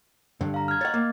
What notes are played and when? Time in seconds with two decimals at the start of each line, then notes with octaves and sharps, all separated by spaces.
0.41 G2 D3
0.54 F5 A#5
0.68 F6 G#6
0.81 C#5 D#5 F#5 A6
0.94 A#3